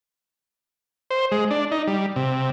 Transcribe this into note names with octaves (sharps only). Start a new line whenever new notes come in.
C5
G#3
D4
D#4
G3
C3